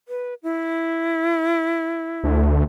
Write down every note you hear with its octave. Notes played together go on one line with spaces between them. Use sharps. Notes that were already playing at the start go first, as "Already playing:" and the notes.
B4
E4
D2